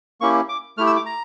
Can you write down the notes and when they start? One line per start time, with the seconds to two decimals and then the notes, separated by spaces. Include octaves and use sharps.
0.21 A#3 C#4 E4 G4 C#6
0.49 D6
0.78 A3 E4 G4 F6
0.87 E6
0.96 D6
1.06 A#5